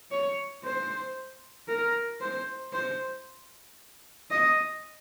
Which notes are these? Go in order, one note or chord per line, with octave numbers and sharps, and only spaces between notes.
C#5
C5
A#4
C5
C5
D#5